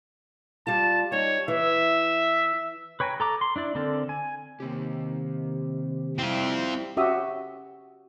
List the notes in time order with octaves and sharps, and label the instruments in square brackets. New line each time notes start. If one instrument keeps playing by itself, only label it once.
[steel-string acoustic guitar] G3 F4 [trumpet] A5
[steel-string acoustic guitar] G3 D#4 [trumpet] C#5
[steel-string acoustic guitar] E3 [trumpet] E5
[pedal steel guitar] B4 C#5 G5 G#5 A#5
A4 A#5 D6
C6
D4 E4 D5
D3 C4 A4 A#4 D5
G#5
[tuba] C3 [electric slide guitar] D#3 A#3 G4
[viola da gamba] G3 E4 [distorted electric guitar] C4 F4 [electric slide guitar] G4 G5
[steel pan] C#4 F#4 G4 E5 D#6